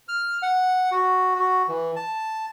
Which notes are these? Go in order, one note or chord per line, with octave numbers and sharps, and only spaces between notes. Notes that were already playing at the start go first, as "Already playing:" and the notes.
F6
F#5
F#4
F#4
E3
A5